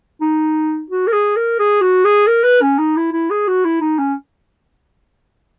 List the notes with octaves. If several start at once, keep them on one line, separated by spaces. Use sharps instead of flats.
D#4
F#4
A#4
G#4
A#4
G#4
F#4
G#4
A#4
B4
C#4
D#4
E4
E4
G#4
F#4
E4
D#4
C#4